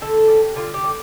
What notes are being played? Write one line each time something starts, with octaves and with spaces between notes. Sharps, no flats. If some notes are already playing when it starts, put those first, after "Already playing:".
D3 A4
G3
D3 F4
G4
G3